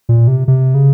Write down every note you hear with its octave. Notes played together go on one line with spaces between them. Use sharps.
A#2
C3
C3
C#3